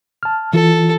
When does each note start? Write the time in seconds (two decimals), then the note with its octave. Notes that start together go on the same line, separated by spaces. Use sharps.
0.23 A5 F6
0.53 E3 F4 A4